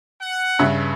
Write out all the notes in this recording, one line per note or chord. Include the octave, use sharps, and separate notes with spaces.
F#5
G2 C#3 E5